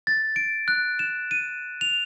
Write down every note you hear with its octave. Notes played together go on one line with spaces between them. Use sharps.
A6
D7
F#6
E7
D#7
F7